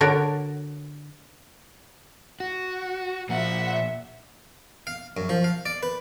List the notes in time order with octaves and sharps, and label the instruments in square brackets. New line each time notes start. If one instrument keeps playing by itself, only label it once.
[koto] D3 F#4 A#4 C#5 D5
[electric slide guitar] F#4
[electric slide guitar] A#2 F3 A#3 [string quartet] E5 F#5
[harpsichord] F5
F#2
F3
F5
D5
B4